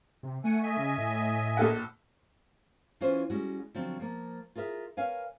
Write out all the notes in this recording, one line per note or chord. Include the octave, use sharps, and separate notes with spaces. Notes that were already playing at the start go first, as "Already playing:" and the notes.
C3
A3 F#5 G#5
D#5 E5 G#5
C#3
A2
A#1 A4 F#5
E3 C#4 F4 B4 C5
G3 G#3 C#4 F#4
D3 F3 F#3 C4 F#4
F3 A#3
F4 G#4 A#4 E5
A#4 B4 C#5 F5 G#5